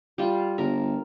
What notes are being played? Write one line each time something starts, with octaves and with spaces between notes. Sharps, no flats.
G3 F4
G1 A#4